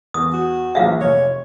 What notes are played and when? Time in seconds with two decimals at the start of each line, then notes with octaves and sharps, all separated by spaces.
0.14 E2 D#6
0.33 F#4
0.75 A#1 E3 G#4 E5 F5
1.01 F1 C#5